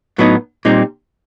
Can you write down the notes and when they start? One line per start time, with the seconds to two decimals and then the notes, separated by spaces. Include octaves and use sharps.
0.18 A2 F#3 B3 D#4
0.65 A#2 G3 C4 D#4